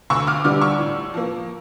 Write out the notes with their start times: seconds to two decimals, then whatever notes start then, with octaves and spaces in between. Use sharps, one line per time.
0.10 D2 C#6 E6
0.27 D6 F6
0.44 D3 G3 D6 F6
0.61 C#6 E6
0.79 A2
1.14 F3 A#3